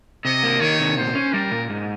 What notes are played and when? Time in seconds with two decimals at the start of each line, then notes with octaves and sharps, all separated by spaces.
0.25 C3 D#5
0.43 A#3
0.61 D#3 C#5
0.79 C3
0.98 A#2 C5
1.15 C#4
1.33 G3 A#4
1.51 A#2
1.70 G#2